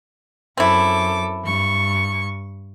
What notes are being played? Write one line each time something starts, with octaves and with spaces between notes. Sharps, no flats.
F#2 C4 E4 A4 D6
G2 C#6